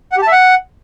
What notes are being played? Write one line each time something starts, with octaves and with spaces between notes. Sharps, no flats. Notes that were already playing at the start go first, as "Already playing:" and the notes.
F#5
G4
A5
E5
F#5